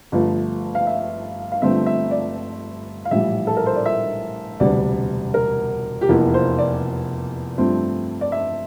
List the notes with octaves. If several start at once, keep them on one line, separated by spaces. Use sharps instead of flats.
G1 G2 F3 A3
F5
E5
F5
G1 G2 F3 A3 C4 E5
E5
D5
F5
A#1 A2 E3 G3 E5
A4
A#4
C5
D5
E5
E1 D2 C3 G3 D5
A#4
G4
F1 E2 E3 A#3 F4
C5
D5
G2 F3 A3 C4
D5
E5